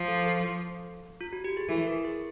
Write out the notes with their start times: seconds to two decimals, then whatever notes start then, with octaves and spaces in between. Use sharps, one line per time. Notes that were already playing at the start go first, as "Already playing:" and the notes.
Already playing: F3
0.08 A4
0.26 A4
1.21 F4
1.33 F#4
1.44 G4
1.57 G#4
1.69 E3 A4
1.87 A#4
2.05 G#4